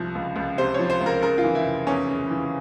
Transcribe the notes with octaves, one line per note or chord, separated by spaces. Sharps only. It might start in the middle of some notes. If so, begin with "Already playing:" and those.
Already playing: C2 F3
C#2
C#2
C3 C5
F3 C#5
C5
C#2
A#4
C#3 A#4
F4
E3
E4
F1
E2 C#4
C#3
E3